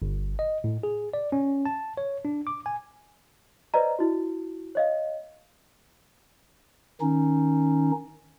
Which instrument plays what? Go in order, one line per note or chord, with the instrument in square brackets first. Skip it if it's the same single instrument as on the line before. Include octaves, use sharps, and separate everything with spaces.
[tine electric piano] G1
D#5
A2
G#4
D5
C#4
A5
C#5
D4
D6
G#5
[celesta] B4 C5 D5 D#5 A#5
E4 F#4
C#5 D#5 F5
[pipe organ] D#3 C#4 D#4